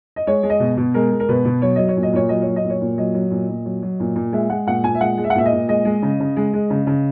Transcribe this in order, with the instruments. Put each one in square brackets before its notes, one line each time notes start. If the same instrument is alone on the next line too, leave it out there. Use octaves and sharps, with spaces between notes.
[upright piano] D#5
G#3 C#5
G#3
D#5
B2
B2
G#3 A#4
G#3
A#4
B2 B4
B2
F#3 C#5
F#3 D#5
C#5
A#2
D#5
A#2 C#5
F#3 D#5
F#3 C#5
D#5
A#2
C#5
A#2
F#3 D#5
F#3
A#2
A#2
F#3
F#3
A#2
A#2
G#3 E5
G#3 F#5
A#2 F#5
A#2 G#5
E5
G#3 F#5
G#3
E5
F#5
A#2 E5
D#5
A#2
G#3 D#5
G#3
C#3
C#3
G#3
G#3
C#3
C#3